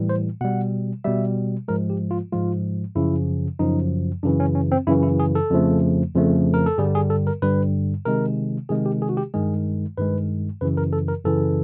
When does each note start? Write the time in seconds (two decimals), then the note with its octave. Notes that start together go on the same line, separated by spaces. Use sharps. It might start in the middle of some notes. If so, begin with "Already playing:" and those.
Already playing: A2 E3 G3
0.09 C5
0.41 B2 G3 F#5
1.04 B2 G3 E5
1.68 G#2 F3 G#3 A#4
1.90 G4
2.11 F4
2.32 G#2 F3 G#3 F4
2.95 F#2 C#3 F3 E4
3.59 F#2 C#3 F3 D#4
4.23 F#2 C#3 E3 D4
4.40 C#4
4.55 C#4
4.72 C4
4.87 F#2 C#3 E3 E4
5.03 E4
5.20 G#4
5.35 A4
5.50 F2 C#3 F3 A3
6.15 F2 C#3 F3 A3
6.54 A#4
6.66 A4
6.78 G2 D3 G3 G#4
6.95 G#4
7.10 A4
7.27 A#4
7.42 G2 D3 G3 B4
8.05 C3 D#3 G#3 A#4
8.69 C3 D#3 G#3 G#4
8.86 G4
9.02 G#4
9.09 F#4
9.17 G4
9.34 G2 D#3 G#3 G#4
9.98 G2 D#3 G#3 B4
10.61 F#2 C#3 E3 B4
10.77 A#4
10.93 A4
11.08 A#4
11.25 F#2 C#3 E3 A4